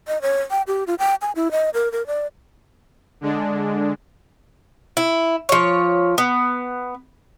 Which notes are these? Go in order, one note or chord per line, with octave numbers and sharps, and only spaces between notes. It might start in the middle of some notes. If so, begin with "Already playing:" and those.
D#5
C#5
G5
G4
F4
G5
G#5
E4
D#5
A#4
A#4
D5
D3 G#3 D4
E4
F3 C#5
B3